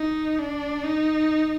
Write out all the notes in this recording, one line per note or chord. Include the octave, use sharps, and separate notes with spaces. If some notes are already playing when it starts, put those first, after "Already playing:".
Already playing: D#4
D4
D#4